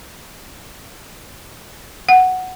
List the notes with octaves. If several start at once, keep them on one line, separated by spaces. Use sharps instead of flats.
F#5